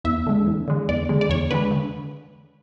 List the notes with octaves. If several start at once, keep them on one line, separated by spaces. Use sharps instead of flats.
E2 E5
D3 G#3
E2
D3 G#3
E2 D5
D3 G#3
D5
E2 C#5
D3 G#3 B4
D3